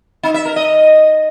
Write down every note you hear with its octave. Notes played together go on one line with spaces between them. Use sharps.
D#4
E5
A#4
D#5